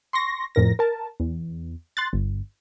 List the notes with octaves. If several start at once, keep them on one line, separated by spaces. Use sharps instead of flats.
C6 C#6 A#6
F2 A2 A#4 A#6
A#4 A5
E2
C6 F#6 A6
G1